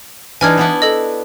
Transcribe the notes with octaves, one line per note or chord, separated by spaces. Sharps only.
E3 D4 D#4 G#5 F6 G#6
B3 D4 E4
A4 D#5